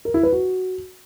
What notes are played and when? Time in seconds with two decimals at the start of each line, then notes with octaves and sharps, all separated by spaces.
0.05 A#4
0.14 E4
0.23 B4
0.32 F#4